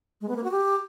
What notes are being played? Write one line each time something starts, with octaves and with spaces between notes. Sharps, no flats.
G#3
B3
A#3
F#4
G4